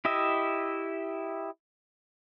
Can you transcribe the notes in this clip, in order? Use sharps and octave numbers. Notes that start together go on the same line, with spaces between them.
E4 G4 D#5 E5